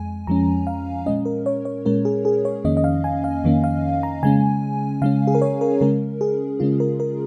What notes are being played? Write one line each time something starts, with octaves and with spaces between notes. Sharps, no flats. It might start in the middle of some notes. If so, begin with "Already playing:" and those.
Already playing: F2 G#3 G#5
F2 F3 G#3 C#4 A#5
F5
A#2 G#3 C#4 D#5
A#4
C#5
C#5
A#2 G#3 C#4 A#4
G#4
G#4
C#5
F2 D#3 A#3 C#4 D#5
D#5
F5
G#5
F5
F2 D#3 A#3 C#4
F5
A#5
C#3 G#3 C#4 G#5
C#3 G#3 C#4 F5
G#4
A#4
C#5
A#4
C#3 G#3 C#4 A#4
G#4
C#3 G#3 C#4 F4
A#4
A#4